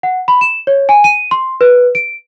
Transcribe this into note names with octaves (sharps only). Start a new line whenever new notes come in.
F#5
B5
E7
C#5
G#5
D#7
C6
B4
D7